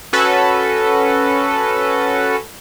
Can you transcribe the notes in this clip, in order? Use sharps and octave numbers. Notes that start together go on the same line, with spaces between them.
C#4 F#4 A4 B4